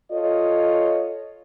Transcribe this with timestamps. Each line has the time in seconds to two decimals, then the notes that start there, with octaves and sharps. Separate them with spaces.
0.12 F4 A4 C#5 D#5